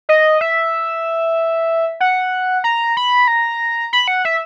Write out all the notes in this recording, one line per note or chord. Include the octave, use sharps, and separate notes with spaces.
D#5
E5
F#5
A#5
B5
A#5
B5
F#5
E5